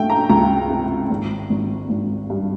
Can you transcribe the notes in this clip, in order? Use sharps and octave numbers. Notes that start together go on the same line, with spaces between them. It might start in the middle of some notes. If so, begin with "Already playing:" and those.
Already playing: A3 G5
A#5
C#2 A#5
C3
G#1
G#1
G#1
G2